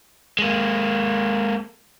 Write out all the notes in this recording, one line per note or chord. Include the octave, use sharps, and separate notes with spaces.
G#3 A#3